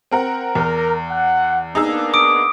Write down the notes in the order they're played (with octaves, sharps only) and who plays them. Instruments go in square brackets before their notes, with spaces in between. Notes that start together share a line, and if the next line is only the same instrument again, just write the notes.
[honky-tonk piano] C4 A#4 F#5
[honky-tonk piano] E2 [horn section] A#4
[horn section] F#5
[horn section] A#3 B3 D4 [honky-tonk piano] D#4 G#4 E6
[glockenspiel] D6 D#6 D7